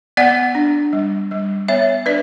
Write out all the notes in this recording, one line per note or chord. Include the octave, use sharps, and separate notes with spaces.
B3 D5 F#5
D4
G3
G3
B3 C#5 E5
D4 B4 D5